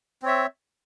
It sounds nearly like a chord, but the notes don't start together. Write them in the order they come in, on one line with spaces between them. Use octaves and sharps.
C4 C#5 E5